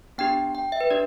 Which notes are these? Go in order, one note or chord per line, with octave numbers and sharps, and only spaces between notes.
B3 D4 G4 G5
G5
E5
B4
D4 G4 D5